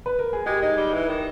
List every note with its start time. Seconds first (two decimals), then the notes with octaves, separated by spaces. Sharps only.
0.06 B4
0.19 A#4
0.33 G#4
0.46 G#3 G4
0.62 G#3 D#4
0.77 G3
0.93 E3
1.09 D#3